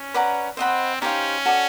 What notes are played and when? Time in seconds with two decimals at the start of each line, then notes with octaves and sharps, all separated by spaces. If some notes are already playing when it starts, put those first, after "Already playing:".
Already playing: C#4
0.14 B4 D5 F#5 A#5
0.57 C4 C5 D#5 F#5 B5
1.01 C#4 D#4 G4 C5 F5
1.45 F#4 A4 D5